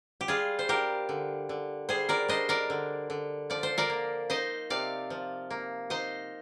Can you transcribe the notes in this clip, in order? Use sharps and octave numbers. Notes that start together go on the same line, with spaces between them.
G4
G3 F4 G#4
C5
D4 G4 A#4
D3
D3
G3 G#4 C5
A#4 D5
D4 C5 D#5
A#4 D5
D3
D3
F3 D5
C5
A#4 D5
A#3
D#4 C5 D#5
C3 D5 F5
F3
A#3
D#4 C5 D#5